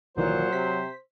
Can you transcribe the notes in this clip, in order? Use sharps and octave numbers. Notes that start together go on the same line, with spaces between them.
C2 A#2 D#3 E3 F#3 C5
C3 B6